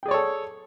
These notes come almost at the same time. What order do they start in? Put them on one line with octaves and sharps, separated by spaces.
G5 G#4 D5 C#5 A4